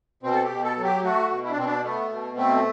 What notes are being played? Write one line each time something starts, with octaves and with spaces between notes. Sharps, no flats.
B2 C4
A4
G4
B2
A4
F#3
G4
A3 F#4
B2
E4
D4
B2 C4
D4
A3 B3
B2
A3 C4